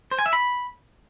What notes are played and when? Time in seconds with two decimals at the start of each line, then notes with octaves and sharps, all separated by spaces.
0.11 C5
0.19 G#5
0.26 E5
0.33 B5